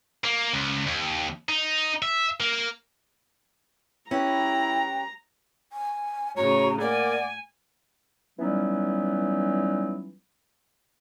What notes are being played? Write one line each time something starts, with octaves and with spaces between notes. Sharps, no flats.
A#3
C#2
D#2
D#4
E5
A#3
C#4 E4 G4 B4 G5 A#5
G#5
A2 C#3 F#4 C#5 A#5
A#3 D5 F#5 G#5
E3 F#3 G3 B3 C#4 D#4